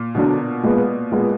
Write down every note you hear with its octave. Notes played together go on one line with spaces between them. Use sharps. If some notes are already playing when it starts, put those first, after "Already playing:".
Already playing: A#2
B2 D3 F#3 D4
A#2 G#3 B3
A#2 G#3 B3